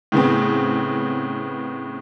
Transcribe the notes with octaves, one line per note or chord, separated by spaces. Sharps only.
A2 C#3 B3 C4